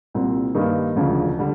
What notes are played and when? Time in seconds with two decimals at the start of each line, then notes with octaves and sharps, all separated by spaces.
0.14 C2 A#2 G3 C4
0.55 G2 D#3 G3 A#3 D#4
0.95 E1 D2 C#3 F3
1.39 D3 G3